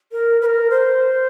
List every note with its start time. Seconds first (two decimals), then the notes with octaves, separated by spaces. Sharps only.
0.12 A#4
0.42 B4
0.46 A#4
0.70 C5